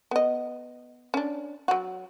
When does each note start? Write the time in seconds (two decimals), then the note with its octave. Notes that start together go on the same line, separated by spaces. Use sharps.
0.11 B3 D#5
1.14 C#4 D4
1.68 F#3 F#4